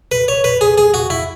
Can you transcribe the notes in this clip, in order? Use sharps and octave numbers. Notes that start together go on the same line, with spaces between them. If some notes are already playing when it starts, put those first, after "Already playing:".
B4
C#5
B4
G#4
G#4
F#4
E4